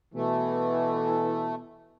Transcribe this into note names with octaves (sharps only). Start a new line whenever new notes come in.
B2 E3 A3